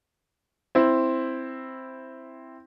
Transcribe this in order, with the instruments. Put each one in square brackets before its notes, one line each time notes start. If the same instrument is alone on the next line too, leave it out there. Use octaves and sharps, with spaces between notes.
[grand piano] C4 E4